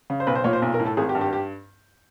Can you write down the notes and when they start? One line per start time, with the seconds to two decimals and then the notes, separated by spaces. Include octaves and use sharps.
0.10 C#3
0.20 C5
0.27 B1 B4
0.35 C5
0.44 A#2 C#5
0.53 C5
0.62 B1
0.74 A#4
0.80 A2
0.86 A4
0.97 G#1 G#4
1.09 G4
1.15 G2
1.21 G4
1.33 G4